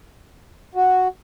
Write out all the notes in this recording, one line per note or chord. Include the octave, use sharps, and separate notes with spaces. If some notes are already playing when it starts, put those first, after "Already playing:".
F#4